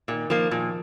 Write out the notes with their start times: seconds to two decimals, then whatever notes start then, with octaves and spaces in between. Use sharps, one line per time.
0.08 A#2 D#3
0.30 D#3 F3 A#3
0.51 A#2 F3